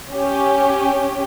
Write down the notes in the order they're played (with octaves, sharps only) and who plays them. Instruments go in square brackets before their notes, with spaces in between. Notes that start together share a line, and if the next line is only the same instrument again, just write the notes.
[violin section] C#4 G4